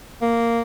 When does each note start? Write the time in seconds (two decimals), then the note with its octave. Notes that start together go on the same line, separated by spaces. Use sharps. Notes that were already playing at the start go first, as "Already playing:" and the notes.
0.22 A#3